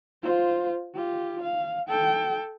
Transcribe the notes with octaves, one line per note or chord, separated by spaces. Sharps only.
F4 C5
F4 G4
F5
A4 G5